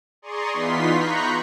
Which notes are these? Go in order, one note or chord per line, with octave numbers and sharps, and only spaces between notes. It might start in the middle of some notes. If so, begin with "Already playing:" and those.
G#4 D5 A#5 C6 C#6 D#6
E3 B3 D#4 F4 C6 B6
A#5 B5 C#6 F#6 G6